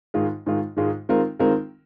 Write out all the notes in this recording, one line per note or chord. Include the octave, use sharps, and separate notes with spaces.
G#2 D#3 G#3 F4
G#2 D#3 G#3 F4
G#2 D#3 G#3 F4
D#3 G#3 C4 F4 A#4
D#3 G#3 C4 F4 A#4